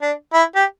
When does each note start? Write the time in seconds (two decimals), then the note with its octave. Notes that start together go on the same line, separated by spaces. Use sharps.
0.02 D4
0.33 E4
0.55 G4